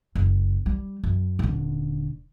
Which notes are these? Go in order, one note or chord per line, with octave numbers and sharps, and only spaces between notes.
F#1
G3
F#2
D#1 D3